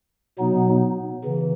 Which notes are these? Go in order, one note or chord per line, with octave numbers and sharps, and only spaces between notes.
B2 F#3 B3 D#4
C#3 E3